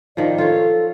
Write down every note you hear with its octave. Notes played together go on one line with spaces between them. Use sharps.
D#3 F3 D5
F4 A4 C#5